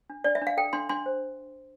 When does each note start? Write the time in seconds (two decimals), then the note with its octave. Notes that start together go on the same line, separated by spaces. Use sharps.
0.10 D4
0.24 D4 D5
0.35 E5
0.42 D4
0.47 F5
0.57 A4 G5
0.73 D4 C6
0.89 D4 C6
1.06 C5